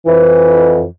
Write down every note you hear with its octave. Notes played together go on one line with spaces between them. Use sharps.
F2 E3